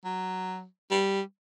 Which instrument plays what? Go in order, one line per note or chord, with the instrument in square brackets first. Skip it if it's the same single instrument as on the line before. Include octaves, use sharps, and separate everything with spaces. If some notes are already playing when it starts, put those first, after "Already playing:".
[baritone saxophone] F#3
G3